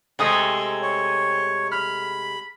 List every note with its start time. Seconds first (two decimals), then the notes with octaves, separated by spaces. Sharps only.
0.19 C3 G#3 A3 G#5 D#6
0.82 C#5
1.72 B5 F6